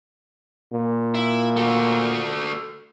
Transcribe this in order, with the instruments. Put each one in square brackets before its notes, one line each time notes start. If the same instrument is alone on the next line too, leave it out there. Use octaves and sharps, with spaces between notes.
[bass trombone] A#2
[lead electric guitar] E4
A3 F#4